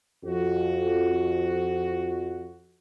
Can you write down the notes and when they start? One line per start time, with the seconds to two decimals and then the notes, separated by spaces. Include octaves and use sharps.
0.24 F2 F#4